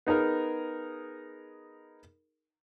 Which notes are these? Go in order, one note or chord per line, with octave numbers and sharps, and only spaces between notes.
B3 D#4 G#4 A#4